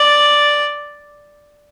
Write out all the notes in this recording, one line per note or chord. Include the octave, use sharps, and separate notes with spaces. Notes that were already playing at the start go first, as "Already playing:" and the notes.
Already playing: D5